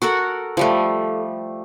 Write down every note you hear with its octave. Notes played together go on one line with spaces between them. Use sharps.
F#4 A4 A#4 F#5
F3 G3 A3